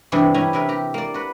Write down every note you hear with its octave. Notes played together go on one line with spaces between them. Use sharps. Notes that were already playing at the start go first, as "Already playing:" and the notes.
G2 C3 E3 D4 E4 G#4
C#4 E4 G4 G#5 A#5
C3 E4 A#4 B4
G4 A#5
A#3 D5
F#4 B4